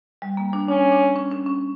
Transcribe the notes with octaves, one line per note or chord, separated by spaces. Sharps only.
G3
A#3
D4
C#4 D4
D4
C#4
C#4
C#4